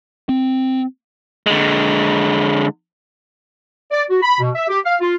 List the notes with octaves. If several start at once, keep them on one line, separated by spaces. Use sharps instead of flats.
C4
D3 G#3
D5
F#4
B5
B2
E5
G4
F5
F4